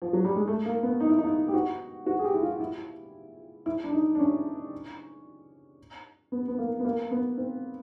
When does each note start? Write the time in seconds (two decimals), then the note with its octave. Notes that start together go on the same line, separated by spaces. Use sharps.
0.02 F3
0.13 F#3
0.25 G3
0.36 G#3
0.47 A3
0.66 A#3
0.83 B3
1.00 D#4
1.09 E4
1.18 D#4
1.27 E4
1.48 G4
1.54 F#4
2.06 F#4
2.19 G#4
2.24 G4
2.34 E4
2.43 F4
2.60 E4
3.66 E4
3.84 D4
3.92 D#4
4.15 D4
4.19 C#4
6.32 B3
6.48 B3
6.58 A#3
6.80 B3
6.85 A#3
7.11 B3
7.37 C4